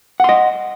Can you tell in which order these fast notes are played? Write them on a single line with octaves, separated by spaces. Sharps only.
F#5 C6 D#5